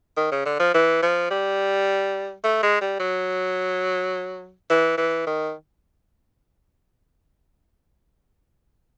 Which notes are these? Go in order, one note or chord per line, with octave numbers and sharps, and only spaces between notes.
D#3
C#3
D3
F3
E3
F3
G3
A3
G#3
G3
F#3
E3
E3
D#3